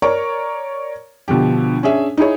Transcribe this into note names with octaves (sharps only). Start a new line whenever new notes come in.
A#4 C#5 D5 A#5 C#6
B2 D3 F3 G4
C#4 D4 G#4 E5
D#4 E4 G#4 C#5